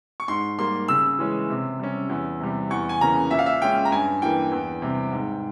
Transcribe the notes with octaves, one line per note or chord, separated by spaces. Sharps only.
C#6
G#2 C6
G3 A#3 C6
C#3 E6
E3 G#3 C#4
C3
G3 C#4
E2
C3 G3
E2 C#6
G#5
C#3 E3 A#3 C#4 A#5
A#2 E5
F5
E5
G#3 C#4 G5
A#5
G2 G#5
E3 A#3 G5
E2
C3 G3
G#2